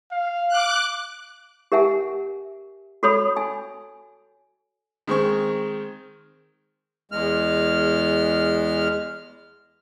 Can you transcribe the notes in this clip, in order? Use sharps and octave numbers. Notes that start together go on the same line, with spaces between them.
F5
D6 F#6
G4 A#4 E5 F#5 G#5
F#4 A4 C#5 B5 D#6
G#5
D#3 G#3 C4 C#6
E2 G#3 F6